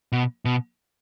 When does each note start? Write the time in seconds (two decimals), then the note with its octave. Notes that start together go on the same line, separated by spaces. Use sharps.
0.12 B2
0.45 B2